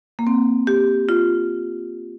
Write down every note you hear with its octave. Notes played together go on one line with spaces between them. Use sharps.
A#3
C4
G4
F4